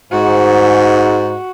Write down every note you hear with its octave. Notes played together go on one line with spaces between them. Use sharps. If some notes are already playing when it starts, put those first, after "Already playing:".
G#2 F#4